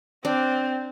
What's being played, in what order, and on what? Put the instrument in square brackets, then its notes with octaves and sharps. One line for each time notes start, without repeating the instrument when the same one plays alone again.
[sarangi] C4 [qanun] D4